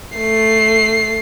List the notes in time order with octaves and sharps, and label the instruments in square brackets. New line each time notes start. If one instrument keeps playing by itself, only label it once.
[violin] A3 C7